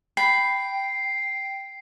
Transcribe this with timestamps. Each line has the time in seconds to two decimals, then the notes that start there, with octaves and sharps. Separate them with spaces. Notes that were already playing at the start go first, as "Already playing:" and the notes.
0.17 G5 B5 C7